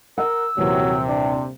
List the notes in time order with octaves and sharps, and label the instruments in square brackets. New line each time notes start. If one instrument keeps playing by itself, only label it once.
[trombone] A#4 [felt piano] F#5 [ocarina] E6
[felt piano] D#1 E3 A#3 [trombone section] C3 [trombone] F#3
[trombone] D4